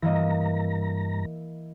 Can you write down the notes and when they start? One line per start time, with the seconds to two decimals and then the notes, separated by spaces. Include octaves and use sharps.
0.02 G2 E3 A#3 D#5 A#5